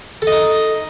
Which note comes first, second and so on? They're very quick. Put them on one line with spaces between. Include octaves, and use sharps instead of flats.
A4 D#5 D#4